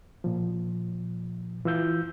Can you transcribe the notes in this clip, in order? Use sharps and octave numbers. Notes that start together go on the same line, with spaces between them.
A#2 F3
E3 F4 E6 G6